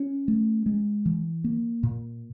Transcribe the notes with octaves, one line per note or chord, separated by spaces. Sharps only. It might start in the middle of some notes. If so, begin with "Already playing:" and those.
Already playing: C#4
A3
G#3
E3
A#3
A#2